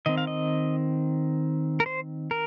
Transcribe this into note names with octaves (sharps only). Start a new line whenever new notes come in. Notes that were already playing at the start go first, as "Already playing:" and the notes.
D#3 C4 D#5
F5
D#5
A#4
C5
A#4